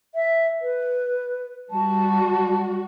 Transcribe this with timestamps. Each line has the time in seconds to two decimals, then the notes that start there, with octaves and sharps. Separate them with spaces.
0.15 E5
0.62 B4
1.70 G3 F#4 A5